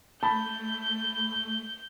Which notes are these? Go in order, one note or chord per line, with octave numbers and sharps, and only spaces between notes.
A3 A5 B5 G6